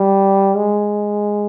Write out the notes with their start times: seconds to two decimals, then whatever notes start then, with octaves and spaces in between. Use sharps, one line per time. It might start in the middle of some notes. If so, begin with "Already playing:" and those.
Already playing: G3
0.56 G#3